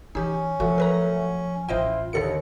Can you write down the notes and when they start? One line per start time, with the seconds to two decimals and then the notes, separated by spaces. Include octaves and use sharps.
0.15 E3 C#4 D#4 G4
0.60 F3 F#3 A3 F#4
0.78 A#4 B4 A#5
1.69 A1 E4 F4 C5 D#5 G5
2.13 D#2 D3 A4 C#7